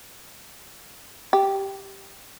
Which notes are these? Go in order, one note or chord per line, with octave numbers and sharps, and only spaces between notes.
G4